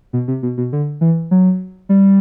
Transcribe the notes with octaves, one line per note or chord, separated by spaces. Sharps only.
B2
C3
B2
B2
D3
E3
F#3
G3